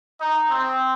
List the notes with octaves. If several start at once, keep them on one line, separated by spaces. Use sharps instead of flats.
D#4
C4